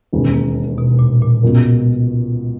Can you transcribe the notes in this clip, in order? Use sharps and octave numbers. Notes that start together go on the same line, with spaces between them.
E1 D#2 C#3
A#3
B2
A#2
A#2
C#2 B2 A#3